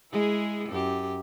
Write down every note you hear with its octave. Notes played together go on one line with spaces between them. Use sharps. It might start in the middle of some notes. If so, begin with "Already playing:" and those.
G#3 E4 G#4
F#2 G4